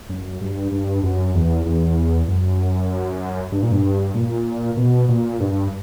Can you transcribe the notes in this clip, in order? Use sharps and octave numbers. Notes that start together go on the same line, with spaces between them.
F#2
G2
G2
F#2
E2
E2
F#2
G2
A#2
G2
A#2
B2
A#2
G2